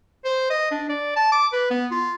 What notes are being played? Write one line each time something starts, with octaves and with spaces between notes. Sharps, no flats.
C5
D#5
D4
D5
A5
D6
B4
B3
F4